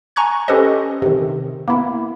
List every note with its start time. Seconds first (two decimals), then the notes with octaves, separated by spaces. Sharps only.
0.16 G#5 A#5 C#6 F#6 G#6
0.48 C#4 G4 A4 B4 C5 D#5
1.02 C3 D#3
1.68 A#3 B3 E4